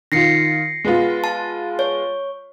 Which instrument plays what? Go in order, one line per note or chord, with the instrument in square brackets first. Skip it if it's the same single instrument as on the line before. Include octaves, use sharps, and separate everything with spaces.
[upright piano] D#3 F4 [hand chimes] A#6 C7 C#7
[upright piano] G#3 B3 F4
[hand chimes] A5
C#5